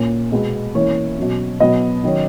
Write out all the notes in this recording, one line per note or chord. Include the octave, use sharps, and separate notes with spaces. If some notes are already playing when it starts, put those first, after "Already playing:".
Already playing: A#2 A#3 C#4
B2 G#3 B3
E3 A#3 C#4 C#5
B2 F#3 C#4
B2 F#3 B3 D#5
D#3 F#3 C#4